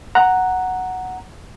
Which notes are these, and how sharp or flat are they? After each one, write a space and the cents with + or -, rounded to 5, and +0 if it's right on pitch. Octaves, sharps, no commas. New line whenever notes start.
F#5 +0 A#5 -5